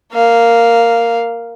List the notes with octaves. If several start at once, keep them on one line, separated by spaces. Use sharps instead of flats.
A#3 F5